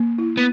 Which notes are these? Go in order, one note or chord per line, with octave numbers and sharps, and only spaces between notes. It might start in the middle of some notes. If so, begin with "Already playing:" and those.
Already playing: A#3
E4
B3